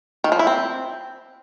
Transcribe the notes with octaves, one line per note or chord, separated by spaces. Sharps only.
D#3
F3
E4
C4